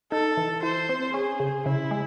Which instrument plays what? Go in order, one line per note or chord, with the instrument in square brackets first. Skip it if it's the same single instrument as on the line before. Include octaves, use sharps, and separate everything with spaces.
[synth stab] D#4 [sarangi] A4
[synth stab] E3
[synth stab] E3 [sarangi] C5
[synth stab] C4
[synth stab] C#4 [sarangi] G#4
[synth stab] C#3
[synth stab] C#3 [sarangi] E4
[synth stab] G#3